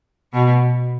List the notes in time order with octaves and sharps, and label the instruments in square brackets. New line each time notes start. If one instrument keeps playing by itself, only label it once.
[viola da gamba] B2